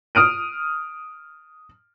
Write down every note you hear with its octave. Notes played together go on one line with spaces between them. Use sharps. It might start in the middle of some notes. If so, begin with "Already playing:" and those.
D#6 F6 D7 D#7